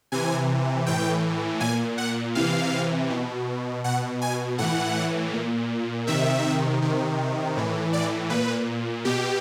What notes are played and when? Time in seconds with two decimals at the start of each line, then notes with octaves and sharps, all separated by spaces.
0.12 C3 E3 G#5
0.86 A2 E3 G5
1.60 A#2 G#5
1.98 F#5
2.35 C3 E3 F5
3.10 B2
3.84 B2 F#5
4.21 G#5
4.58 A2 E3 F#5
5.33 A#2
6.07 C3 D#3 E5
6.82 C3 D#3
7.56 A2 E3
7.93 D5
8.30 A#2 B4
9.05 B2 G4